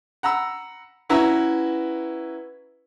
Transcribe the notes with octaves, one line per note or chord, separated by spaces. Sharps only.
F#5 A#5 B5 E6
C#4 E4 F#4 B4 E5 A#5